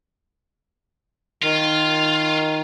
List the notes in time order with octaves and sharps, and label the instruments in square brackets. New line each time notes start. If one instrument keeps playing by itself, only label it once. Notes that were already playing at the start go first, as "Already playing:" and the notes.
[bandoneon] D#3 [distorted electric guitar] F4